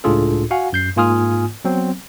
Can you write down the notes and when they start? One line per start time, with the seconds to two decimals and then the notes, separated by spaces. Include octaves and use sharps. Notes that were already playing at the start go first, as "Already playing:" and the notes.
0.04 C#2 A2 D4 F4 G#4 A4
0.51 F#4 F5 F#5 G#5
0.73 F#2 G6 C7
0.96 G#2 A#3 F4 G#5 D#6 F6
1.65 F#3 B3 C4